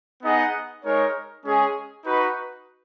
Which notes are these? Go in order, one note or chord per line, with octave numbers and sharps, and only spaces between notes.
B3 D#4 G#4 D#5 F#5
G#3 D#4 A#4 C#5
G#3 C#4 G#4
D#4 F#4 B4